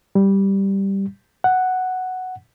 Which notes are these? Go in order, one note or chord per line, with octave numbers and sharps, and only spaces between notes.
G3
F#5